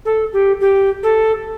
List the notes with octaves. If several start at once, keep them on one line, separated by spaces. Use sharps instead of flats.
A4
G4
G4
A4